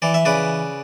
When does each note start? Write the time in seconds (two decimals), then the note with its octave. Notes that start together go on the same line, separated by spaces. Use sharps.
0.02 E3 D5
0.14 E5
0.25 C#3 B4 D5